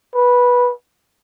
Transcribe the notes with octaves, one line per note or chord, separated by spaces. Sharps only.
B4